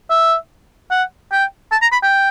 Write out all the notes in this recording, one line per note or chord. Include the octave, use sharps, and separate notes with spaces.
E5
F#5
G5
A5
A#5
B5
G5